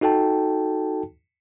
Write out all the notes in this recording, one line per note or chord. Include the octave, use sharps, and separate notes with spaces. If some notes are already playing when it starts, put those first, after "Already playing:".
D#4 F#4 A4 G5 A5